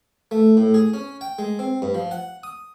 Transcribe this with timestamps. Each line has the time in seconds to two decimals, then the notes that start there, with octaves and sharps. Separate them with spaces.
0.31 A3
0.57 A2
0.74 G#4
0.94 C#4
1.21 G5
1.39 G#3
1.59 C4
1.82 G2
1.94 F3
2.11 F#5
2.43 D#6